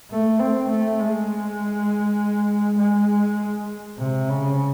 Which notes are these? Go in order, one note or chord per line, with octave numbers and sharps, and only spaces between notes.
A3
C4
A3
G#3
G#3
C3
C#3